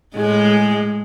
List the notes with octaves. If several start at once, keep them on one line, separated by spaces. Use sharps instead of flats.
A2 G#3 G#4